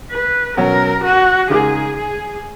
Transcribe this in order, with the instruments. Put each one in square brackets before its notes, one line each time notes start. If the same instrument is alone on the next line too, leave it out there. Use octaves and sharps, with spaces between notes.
[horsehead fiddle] B4
[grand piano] B2 F#3 C#4 F#4 [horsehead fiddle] A#4
[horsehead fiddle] F#4
[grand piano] C#3 G#3 D#4 A#4 [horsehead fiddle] G#4
[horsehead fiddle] G#4